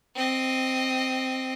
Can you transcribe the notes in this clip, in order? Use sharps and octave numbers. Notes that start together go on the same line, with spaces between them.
C4 D#5